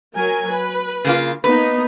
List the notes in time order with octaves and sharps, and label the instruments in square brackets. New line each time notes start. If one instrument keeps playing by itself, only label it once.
[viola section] F#3 A#4 G#5
B4
[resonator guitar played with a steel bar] C#3 A#3 F4
[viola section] A#3 B3 D#4 [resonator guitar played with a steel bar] B4